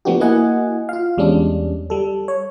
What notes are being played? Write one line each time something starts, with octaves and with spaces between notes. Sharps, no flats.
F3 A3 B3 D4 F#4 G4
A#3 E4 F#4 D#5 F#5 G#5
F4 F5
E2 G3 G#3 C#4 D4
G3 A4
C#5